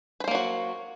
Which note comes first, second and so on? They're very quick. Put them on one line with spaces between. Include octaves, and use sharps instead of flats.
B4 C5 A#3 F#3 F#4